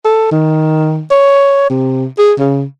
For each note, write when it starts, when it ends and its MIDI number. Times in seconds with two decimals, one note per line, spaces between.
0.05 0.28 69
0.31 1.04 51
1.11 1.66 73
1.70 2.06 48
2.18 2.33 68
2.38 2.64 49